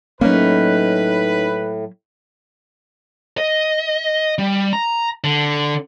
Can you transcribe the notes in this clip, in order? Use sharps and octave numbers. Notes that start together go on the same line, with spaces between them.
A2 F#3 A3 A#3 C#4 D#4 B4
D#5
G3
A#5
D3